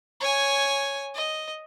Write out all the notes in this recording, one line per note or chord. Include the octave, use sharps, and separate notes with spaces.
C#5 G#5
D#5